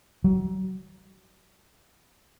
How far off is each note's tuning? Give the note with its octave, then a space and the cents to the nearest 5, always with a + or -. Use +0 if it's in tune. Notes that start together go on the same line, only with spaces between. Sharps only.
F#3 +30